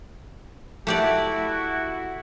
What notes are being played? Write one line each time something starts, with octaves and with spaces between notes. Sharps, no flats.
A3 E4 F#4 G4 D5